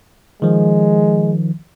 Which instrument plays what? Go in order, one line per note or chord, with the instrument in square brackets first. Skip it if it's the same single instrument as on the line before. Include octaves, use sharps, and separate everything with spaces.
[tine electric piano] D#3 F3 [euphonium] G#3